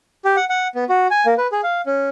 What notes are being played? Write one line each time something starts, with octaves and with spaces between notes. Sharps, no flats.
G4
F#5
F#5
B3
F#4
G#5
A#3
B4
G#4
F5
C#4